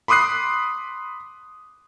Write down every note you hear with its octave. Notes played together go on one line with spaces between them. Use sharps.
B5 C6 D6 D#6 F#6 C7